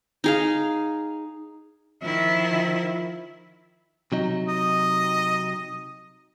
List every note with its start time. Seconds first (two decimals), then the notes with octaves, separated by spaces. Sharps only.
0.24 D#4 G#4 F5
2.03 D#3 F3 E4
4.12 C3 F#3 D#4
4.48 D#5